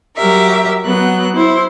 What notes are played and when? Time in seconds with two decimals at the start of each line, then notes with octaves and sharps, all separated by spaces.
0.16 F#3 G4 A#4 E5
0.84 F#3 B3 F#6
1.35 E4 C5